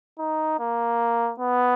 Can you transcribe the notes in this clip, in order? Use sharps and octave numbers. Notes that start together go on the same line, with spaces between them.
D#4
A#3
B3